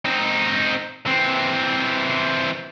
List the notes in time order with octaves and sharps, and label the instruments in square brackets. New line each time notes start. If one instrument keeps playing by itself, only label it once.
[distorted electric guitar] C4 D#4
E3 C4